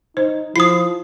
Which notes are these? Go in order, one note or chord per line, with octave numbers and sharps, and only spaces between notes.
D#4 C5
F3 E4 D#6 C7